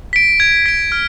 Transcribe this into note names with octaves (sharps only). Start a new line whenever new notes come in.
B6 D7
G#6
B6 D7
F6